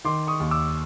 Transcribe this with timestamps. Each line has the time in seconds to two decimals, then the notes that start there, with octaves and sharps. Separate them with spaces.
0.05 D#3 C6 D6
0.27 C#6 D#6
0.40 D#2
0.51 D6 E6